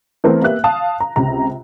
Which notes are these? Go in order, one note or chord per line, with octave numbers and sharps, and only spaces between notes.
E3 A3 B3 C4 A#4
A#3 B3 G4 E5 F#6
F5 A5 D#6
A#5
C#2 C3 A#5